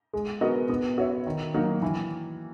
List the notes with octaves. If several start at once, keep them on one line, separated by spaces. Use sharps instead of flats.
G#3
B3 F#4 A#4 D#5
B3
F#4 C#5 E5
D#3
F#3 A#3 D#4 F#4
E3